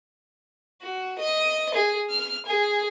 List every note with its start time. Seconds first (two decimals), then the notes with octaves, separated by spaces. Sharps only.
0.81 F#4
1.19 D#5
1.74 G#4
2.10 F6
2.46 G#4